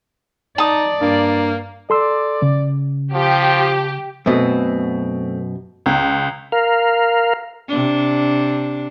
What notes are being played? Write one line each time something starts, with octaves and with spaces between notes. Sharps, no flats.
D#4 D5 A5 D#6
G2 A#3
A4 D5 C6 E6
C#3
F3 G4
F#2 B2 A3 C4 B4
C#2
A#4 F5
C3 D4